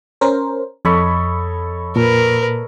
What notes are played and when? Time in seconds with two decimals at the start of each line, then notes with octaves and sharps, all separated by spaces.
0.21 C#4 A#4 C5
0.85 F2 A4 C#5 D#5 B5
1.96 A#2 A#4 B4